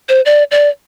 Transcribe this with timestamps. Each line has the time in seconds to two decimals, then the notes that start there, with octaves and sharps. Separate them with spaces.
0.09 C5
0.26 D5
0.51 D5